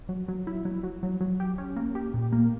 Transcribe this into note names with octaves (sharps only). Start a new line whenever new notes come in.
F#3
F#3
E4
F#3
F#3
F#3
F#3
G4
C#4
A#3
G4
A#2
A#3